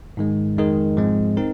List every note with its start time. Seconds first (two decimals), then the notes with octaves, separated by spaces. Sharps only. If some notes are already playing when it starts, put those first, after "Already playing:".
0.17 G#2 D#3 G#3
0.57 F2 D#3 G#3 D#4 A#4
0.97 G#2 F3 G#3 C4
1.37 C4 D#4 A#4